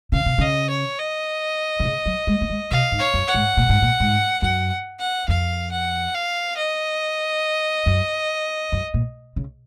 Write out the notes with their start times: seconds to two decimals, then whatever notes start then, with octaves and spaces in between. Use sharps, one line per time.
0.12 C#3 F5
0.26 C3
0.38 C#3 D#5
0.70 C#5
0.99 D#5
1.80 D#3
1.85 C#3
2.06 F#3
2.27 G#3
2.41 A#3
2.50 G#3
2.71 C3 F5
2.92 G#2
2.99 C#5
3.14 F#2
3.28 F#5
3.34 G#2
3.57 A#2
3.69 G#2
3.82 A#2
4.00 G#2
4.42 F#2 F#5
5.00 F#5
5.28 F2 F5
5.72 F#5
6.15 F5
6.57 D#5
7.86 F#2
8.72 F#2
8.94 A#2
9.36 C#3